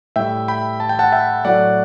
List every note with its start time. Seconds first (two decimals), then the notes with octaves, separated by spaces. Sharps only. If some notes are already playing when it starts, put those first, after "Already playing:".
0.16 A2 G3 E5 G5
0.48 G5 B5
0.80 A5
0.89 G5
0.99 F#5 A5
1.12 E5 G5
1.45 A2 F#3 A3 D5 F#5